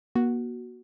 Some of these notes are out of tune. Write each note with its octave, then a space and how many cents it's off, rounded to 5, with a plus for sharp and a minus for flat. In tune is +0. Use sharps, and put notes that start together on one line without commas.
A#3 +45 F#4 +0